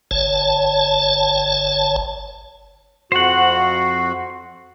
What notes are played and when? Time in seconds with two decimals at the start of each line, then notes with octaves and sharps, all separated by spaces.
0.11 G1 C#5 A5
3.12 F2 F#4 C5 F#5